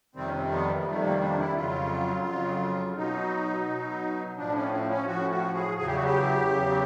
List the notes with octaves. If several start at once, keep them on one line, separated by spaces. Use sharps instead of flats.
F2 C3 D#3 G3 C4
C#4
C4
B3
A#3
F2 C3 D#3 G3 A3
A#3
D4
E4
F2 C#3 F#3 F4
F2 C#3 F#3
B2 F#3 D#4
B2 F#3
A2 F3 D4
C#4
C4
C#4
A2 F3 F#4
F#4
G#4
E2 C#3 F#3 G#4
G4
F#4
G4
E2 C#3 F#3